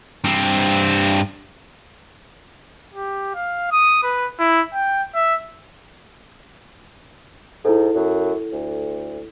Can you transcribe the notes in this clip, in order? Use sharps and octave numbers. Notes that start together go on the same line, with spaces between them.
G2 C4
G4
F5
D#6
B4
E4
G5
E5
G#2 E4 A4
F#2
D2